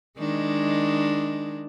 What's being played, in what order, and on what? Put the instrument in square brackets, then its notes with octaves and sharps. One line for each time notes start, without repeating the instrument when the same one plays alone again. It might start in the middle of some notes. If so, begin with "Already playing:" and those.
[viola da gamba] D#3 G#3 D4